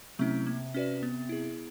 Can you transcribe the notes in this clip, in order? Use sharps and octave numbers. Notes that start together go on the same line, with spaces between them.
C3 F#3 A3 C#4 E4
A#3
C#4 F#4 B4 D5
B3
E4 G#4